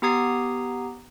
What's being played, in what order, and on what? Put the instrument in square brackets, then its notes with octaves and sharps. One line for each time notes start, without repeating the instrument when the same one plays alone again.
[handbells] B3 G4 A#5 D#6 G#6 C7